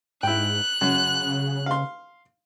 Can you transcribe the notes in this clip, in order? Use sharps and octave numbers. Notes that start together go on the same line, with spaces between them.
G#2 E4 G5 F#6
F#2 C#3
F5 C6